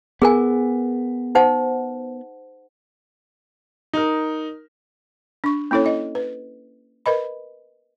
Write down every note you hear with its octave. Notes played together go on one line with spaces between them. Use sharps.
B3 G#4 A#4 G#5
D#4 C5 F#5
D#4 A#4
D4 C#6
A#3 C#4 E4 A4 C#5
E4 D#5
B4
A#4 B4 D#5 B5